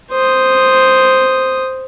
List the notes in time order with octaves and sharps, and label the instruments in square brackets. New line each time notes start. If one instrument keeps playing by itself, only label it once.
[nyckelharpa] C5 D#6